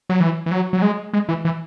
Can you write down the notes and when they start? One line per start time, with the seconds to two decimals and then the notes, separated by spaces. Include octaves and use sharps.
0.09 F#3
0.20 E3
0.46 E3
0.51 F#3
0.73 F#3
0.82 G#3
1.13 G#3
1.29 E3
1.45 E3